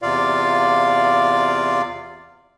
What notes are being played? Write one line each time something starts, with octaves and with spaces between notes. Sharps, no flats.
E2 C3 F4 D5 F5